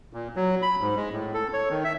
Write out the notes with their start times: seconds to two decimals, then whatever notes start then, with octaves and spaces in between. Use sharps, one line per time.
0.13 A#2
0.36 F#3
0.62 B5
0.81 G#2
0.97 G#3
1.13 A2
1.34 A4
1.53 C#5
1.70 D#3
1.84 E5